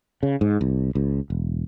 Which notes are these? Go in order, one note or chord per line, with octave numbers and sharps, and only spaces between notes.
C#3
G#2
C2
C#2
E1